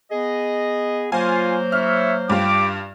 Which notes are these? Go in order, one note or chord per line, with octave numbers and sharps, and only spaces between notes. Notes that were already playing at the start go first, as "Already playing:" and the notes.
B3 G#4 D#5
F#3 A#3 F4 C5 F5 G#5
E4 C#5 E5 F6
G2 F4 G4 D6